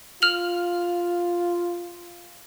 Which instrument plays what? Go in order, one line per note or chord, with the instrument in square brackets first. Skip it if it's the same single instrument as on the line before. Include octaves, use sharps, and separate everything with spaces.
[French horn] F4 [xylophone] F6 F7 F#7